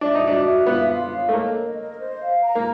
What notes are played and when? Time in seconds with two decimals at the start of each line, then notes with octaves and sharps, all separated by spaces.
0.01 D4 E5
0.15 D#4
0.22 D4 F#4
0.45 E5
0.66 B3 F4
0.90 F5
1.12 C#5
1.29 A3
1.33 A#3 D#5
1.55 A#4
1.77 D#5
1.99 C5
2.21 F5
2.43 A#5
2.55 A#3